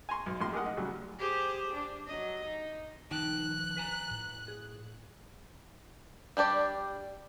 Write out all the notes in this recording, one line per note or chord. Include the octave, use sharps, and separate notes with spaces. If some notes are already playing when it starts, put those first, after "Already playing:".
G#5 A#5 C6 C#6
B1
A#1 A2 C6
G#3 G4 G#4 A#4 D#5 F#5
D#4
A2 C#3 F#3 G3
G4 G#4 C5
D4
F#3 D#5
D#4
D#3 F3 D#4 G5 A5 F#6
B4 G#5 A#5
A2
G#4
G3 D4 G4 D5